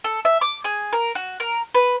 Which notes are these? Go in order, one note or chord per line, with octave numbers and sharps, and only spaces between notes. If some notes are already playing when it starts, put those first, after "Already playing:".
A4
E5
D6
G#4
A#4
F#4
A#4
B4